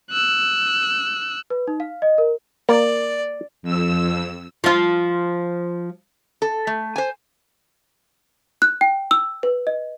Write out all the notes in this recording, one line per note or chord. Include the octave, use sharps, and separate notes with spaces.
E6 F#6
B4
D#4
F5
D#5
A#4
A#3 D5
F2 E6
F3 F4
A4
A3
C5 G#5
F#6
G5
E6
B4
D#5